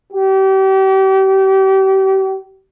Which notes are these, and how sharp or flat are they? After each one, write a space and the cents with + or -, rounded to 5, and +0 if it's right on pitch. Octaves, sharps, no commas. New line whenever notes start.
G4 -35